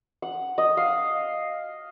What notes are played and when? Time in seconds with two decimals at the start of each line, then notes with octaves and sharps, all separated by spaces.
0.22 F#5
0.58 D#5
0.77 F5